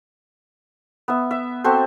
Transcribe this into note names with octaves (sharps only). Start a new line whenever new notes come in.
B3 E5
E5
C4 F#4 A4 C5